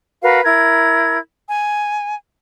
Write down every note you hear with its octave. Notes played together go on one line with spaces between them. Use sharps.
F#4 A#4 B4 F5
E4 A#4 G#6
G#5